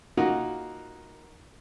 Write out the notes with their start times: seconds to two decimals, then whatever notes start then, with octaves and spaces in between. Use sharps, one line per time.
0.17 A#3 D#4 F4 F#4 A#4 F#5